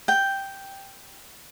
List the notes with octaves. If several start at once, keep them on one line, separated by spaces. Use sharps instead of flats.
G5